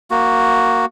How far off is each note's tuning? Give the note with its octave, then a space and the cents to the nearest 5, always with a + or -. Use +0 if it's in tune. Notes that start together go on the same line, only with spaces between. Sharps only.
A#3 +0 F#4 +0